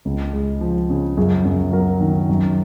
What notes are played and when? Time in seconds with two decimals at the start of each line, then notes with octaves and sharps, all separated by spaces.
0.05 C#2
0.34 G#3
0.61 F3
0.90 C#3
1.17 F#2 G#4
1.45 F#2
1.73 F#3 A#4
2.01 D#3
2.29 F#2